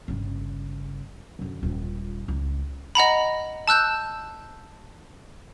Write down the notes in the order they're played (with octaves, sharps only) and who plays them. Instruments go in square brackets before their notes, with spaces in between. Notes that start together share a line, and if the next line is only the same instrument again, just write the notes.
[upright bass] G1 C#3
F#2 D3
D#1 F4
C#2
[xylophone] D#5 F#5 A#5 B5
A5 E6 F#6 G6